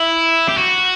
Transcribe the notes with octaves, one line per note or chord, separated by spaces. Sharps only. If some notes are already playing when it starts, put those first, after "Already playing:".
Already playing: E4
G4
F#4